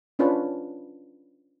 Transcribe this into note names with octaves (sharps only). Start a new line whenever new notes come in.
C#4 D4 F4 B4 C#5